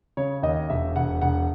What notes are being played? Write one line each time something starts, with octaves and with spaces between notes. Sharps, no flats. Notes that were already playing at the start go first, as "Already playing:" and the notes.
C#3 C#5
D#2 D#5
E1 E5
E1 F#5
E1 F#5